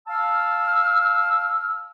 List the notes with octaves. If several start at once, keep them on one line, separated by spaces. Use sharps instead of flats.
F5 A5 E6 F6